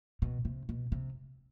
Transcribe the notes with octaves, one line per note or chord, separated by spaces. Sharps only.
B2
C3
B2
C3